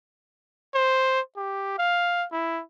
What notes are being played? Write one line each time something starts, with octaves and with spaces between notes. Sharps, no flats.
C5
G4
F5
E4